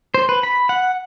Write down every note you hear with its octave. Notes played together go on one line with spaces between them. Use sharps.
C5
B4
B5
F#5